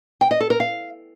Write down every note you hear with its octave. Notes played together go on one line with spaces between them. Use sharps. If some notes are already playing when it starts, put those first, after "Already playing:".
G5
D#5
A4
A#4
F5